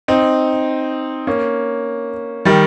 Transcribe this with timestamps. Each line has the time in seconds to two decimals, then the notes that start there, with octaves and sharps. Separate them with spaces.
0.08 C4 D#4
1.27 A#3 C#4
2.45 D#3 G3